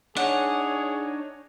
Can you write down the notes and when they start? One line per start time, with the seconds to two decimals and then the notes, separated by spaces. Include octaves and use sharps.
0.17 D4 D#4 G#4 C#5 F#5